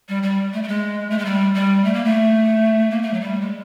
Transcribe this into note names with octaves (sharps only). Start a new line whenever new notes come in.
G3
G3
A3
A3
G#3
A3
G#3
G3
G3
A3
A#3
A3
A#3
A3
F#3
G3
G#3